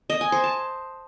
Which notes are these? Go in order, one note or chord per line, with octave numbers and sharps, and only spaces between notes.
D#5
G#5
C5
A5